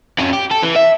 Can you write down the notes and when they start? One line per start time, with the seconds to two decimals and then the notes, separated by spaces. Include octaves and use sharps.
0.18 F2 C#4
0.33 G4
0.51 A4
0.63 E3
0.76 E5